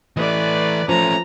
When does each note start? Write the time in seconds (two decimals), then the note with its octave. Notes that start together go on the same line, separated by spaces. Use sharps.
0.17 E3 A3 B4 D5 D#5
0.89 F3 A3 C#4 A#5